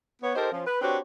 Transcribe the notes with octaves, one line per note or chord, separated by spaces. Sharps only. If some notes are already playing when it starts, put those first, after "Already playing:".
B3 C#5
D#4 G4 A4 A#4 C5
F3 C#4
B4
C4 D4 F#4 G4 B4 C#5